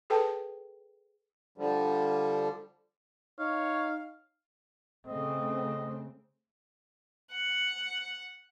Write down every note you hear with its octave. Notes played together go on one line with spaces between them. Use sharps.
G#4 A4 B4 G5 A5
D3 F3 G3
D#4 C#5 F5
C#3 A3 C4 D#5
F#5